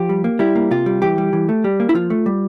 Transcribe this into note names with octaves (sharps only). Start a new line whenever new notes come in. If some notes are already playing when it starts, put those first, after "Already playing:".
Already playing: F3 G4
G3
A#3
G3 E4
A#3
C3 F4
G3
E3 G4
G3
E3
A3
G3
A#3
E4
F3 F4
A3
G3